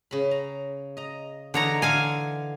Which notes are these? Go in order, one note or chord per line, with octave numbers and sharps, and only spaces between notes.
C#3 B5
A#5
D#5 A#5
D3 E3 D#4 C#5 F#5 A#5
D3 F5 G#5